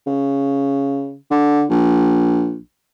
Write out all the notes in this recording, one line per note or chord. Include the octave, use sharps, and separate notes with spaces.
C#3
D3
A#1